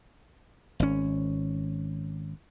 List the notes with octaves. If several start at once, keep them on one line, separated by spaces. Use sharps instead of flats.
G#1 C#4